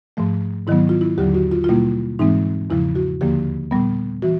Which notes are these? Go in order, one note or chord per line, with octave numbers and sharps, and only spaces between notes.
G#2 F3 A3
G#2 D#3 F#3 B3 E4
F4
E4
D#2 D3 F#3 G4
F#4
F4
F4
B2 G3 A#3 E4
G#2 E3 G#3 C4 D#4
E2 C#3 F3 E4
F#4
D#2 D3 F3 A#3 G4
A#2 G3 B3
E3 F#4